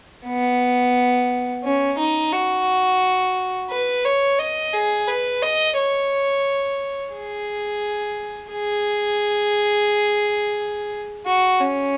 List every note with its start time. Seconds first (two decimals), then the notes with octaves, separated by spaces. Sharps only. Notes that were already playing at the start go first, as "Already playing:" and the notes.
0.26 B3
1.64 C#4
1.98 D#4
2.33 F#4
3.70 B4
4.05 C#5
4.39 D#5
4.73 G#4
5.08 B4
5.42 D#5
5.77 C#5
7.14 G#4
8.51 G#4
11.26 F#4
11.61 C#4